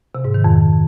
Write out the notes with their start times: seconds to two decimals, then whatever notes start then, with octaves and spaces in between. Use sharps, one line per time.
0.15 C3
0.25 G#2
0.34 D#3
0.44 F2